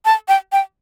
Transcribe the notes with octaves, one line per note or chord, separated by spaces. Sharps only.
A5
G5
G5